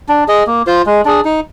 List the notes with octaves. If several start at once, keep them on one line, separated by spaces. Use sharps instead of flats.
D4
G#4 D#5
A#3
F4 C5
G#3
D4 G#4
D#4